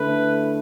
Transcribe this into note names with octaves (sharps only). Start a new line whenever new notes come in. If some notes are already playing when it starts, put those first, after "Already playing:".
Already playing: D3 A3 E4 B4